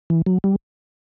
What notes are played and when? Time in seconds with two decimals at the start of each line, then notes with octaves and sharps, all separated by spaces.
0.10 E3
0.26 F#3
0.44 G3